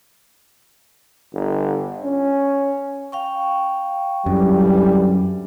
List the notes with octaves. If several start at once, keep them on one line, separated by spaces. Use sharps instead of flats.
G1
C#4
F5 G5 C#6
F#2 D3 E3 G3